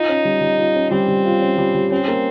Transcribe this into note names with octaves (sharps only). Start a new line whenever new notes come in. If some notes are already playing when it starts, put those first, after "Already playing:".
Already playing: D#4 F4
C#4
G3
G3
F4
C#4
G3 C4
G3
F4
C#4
G3
G3
C4 C#4
A#3